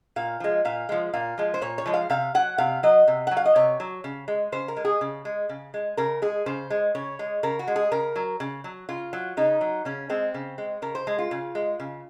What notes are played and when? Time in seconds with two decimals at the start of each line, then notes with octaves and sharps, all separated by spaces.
0.16 A#2 F5
0.40 F3 G#3
0.65 A#2 F5
0.89 F3 G#3
1.14 A#2 F5
1.38 F3 G#3
1.54 C5
1.62 A#2 C#5
1.78 C#5
1.86 F3 G#3
1.94 F5
2.10 C3 F5
2.35 F#3 F#5
2.58 C3 F5
2.83 F#3 D#5
3.08 C3
3.27 F#3 F#5
3.37 F5
3.46 D#5
3.56 C3 C#5
3.80 F#3
4.04 C#3
4.28 G#3
4.52 C#3 C5
4.68 A#4
4.77 G#3
4.85 G#4
5.01 C#3
5.25 G#3
5.49 C#3
5.74 G#3
5.97 C#3 A#4
6.22 G#3 G#4
6.46 C#3 C5
6.70 G#3
6.95 C#3 C#5
7.19 G#3
7.43 C#3 A#4
7.59 F#4
7.67 G#3
7.76 G#4
7.92 C#3 A#4
8.16 F#3
8.40 C#3
8.64 F#3
8.89 C#3 F4
9.13 F#3
9.37 C#3 D#4
9.61 F#3
9.85 C#3 C#4
10.09 G#3 C4
10.34 C#3
10.58 G#3
10.82 C#3 A#4
10.95 C5
11.07 G#3 G#4
11.19 F4
11.31 C#3
11.55 G#3
11.80 C#3